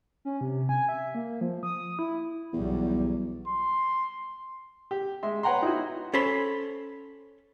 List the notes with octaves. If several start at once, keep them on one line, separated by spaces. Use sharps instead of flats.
C#4
C3
G#5
E5
A#3
F3
D#6
E4
B1 E2 F#3 G3
C6
G4
G#3 E5 C6
B4 C#5 F#5 G5 A#5 C6
D#4 E4 F#4
C#4 A4 C5 C#5 B5 C6